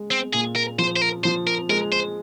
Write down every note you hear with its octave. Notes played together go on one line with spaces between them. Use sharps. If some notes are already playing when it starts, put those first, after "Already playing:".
Already playing: G#3
C4
A#2 G#4
A#4
F3 C5
C5
A#4
F3 C5
A#4
G#3 A#4
C5